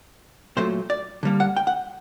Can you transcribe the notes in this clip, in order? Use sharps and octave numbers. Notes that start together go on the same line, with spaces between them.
A#2 F#3 A3 C5
D5
D3 G3 A#3
F#5
G5
F#5